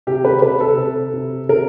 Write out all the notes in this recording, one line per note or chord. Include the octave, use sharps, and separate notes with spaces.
C3 G4
B4
C3 B4
A4
C3
C3
C3 A#4